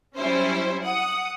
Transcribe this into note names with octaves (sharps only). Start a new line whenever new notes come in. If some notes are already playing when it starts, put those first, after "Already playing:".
F#3 G3 C#4 E4 C5
F#5 D#6